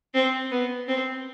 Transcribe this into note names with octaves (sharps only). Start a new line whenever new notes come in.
C4
B3
C4